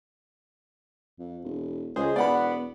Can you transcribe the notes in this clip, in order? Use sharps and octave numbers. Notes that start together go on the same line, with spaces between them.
F2
E1
C#2 G#3 G#4 C5
E1 B3 D5 F#5 B5